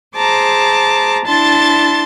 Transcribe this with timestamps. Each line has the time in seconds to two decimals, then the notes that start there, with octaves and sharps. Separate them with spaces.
0.17 G#4 C5 A5 A#5 D6
1.27 D4 E4 A5 C6 A6